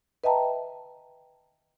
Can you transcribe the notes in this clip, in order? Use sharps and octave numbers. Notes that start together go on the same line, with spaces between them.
B4 D#5 E5 G5 A5 A#5